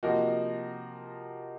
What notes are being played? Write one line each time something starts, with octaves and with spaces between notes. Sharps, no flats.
C3 F3 A#3 D#4 F#4